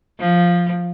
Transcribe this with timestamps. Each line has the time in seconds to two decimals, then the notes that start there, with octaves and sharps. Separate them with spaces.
0.20 F3